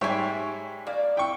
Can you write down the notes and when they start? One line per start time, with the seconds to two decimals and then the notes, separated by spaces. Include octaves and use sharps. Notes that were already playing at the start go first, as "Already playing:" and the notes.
0.01 G#2 G3 C#5 E5 G5 G#5
0.87 A#3 D5
1.17 E4 G5 C#6